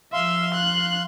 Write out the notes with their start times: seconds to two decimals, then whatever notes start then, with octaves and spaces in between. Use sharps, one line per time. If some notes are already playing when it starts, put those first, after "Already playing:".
0.13 F3 E5 F5 C6
0.54 F#6